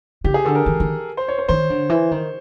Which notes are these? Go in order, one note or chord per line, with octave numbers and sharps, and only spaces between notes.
C#3 G4
G#4
D3 A4
A#4
D#3
D#3
C5
C#5
C5
D#3 C5
D3
E3
D#3